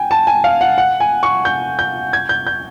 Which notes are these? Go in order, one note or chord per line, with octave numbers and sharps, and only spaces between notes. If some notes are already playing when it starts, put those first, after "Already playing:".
Already playing: G5 G#5
A5
G#5
F5
F#5
F#5
G#5
C#6
G6
G6
G#6
G6
G6